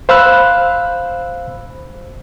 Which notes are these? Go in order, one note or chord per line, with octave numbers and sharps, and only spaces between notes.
C5 F5 B5 E6 F#6